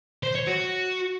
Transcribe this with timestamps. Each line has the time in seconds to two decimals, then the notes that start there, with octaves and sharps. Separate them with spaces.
0.23 C5
0.35 C#5
0.47 F#4